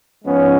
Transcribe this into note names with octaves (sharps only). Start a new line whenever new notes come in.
G#2 F3 G#3 B3 C#4